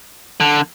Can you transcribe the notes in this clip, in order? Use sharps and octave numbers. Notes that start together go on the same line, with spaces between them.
D3